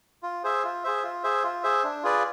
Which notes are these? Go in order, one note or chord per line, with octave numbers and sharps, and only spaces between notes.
F4
G#4 C5 E5
F4
G#4 C5 E5
F4
G#4 C5 E5
F4
G#4 C5 E5
D4
F4 G#4 B4 D5